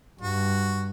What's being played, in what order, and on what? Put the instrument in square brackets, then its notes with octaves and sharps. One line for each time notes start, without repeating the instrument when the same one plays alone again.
[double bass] G2 [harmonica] F#4